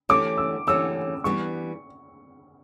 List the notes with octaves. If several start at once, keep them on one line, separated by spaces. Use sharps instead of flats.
E3 A3 C#4 G4 C#5 D6
E6
E3 A3 C#4 G4 C#5 E6
E3 G3 B3 D4 G4 C#6